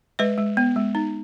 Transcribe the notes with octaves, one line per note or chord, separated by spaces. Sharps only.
G#3 B4 D#5
G#3
B3
G#3
D#4